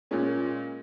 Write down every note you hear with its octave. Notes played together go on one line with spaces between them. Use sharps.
A#2 G#3 C#4